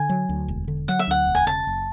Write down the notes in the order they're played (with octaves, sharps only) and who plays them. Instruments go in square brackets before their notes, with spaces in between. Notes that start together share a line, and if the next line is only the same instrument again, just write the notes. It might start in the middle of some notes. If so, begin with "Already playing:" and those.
Already playing: [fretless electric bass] D3 [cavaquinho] G#5
[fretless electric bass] F#3
D2
E1
D3
[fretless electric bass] F#3 [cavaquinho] F#5
[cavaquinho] E5
[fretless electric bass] D2 [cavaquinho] F#5
[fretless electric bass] E1
[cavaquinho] G#5
[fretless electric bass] C#3 [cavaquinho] A5
[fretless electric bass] F#1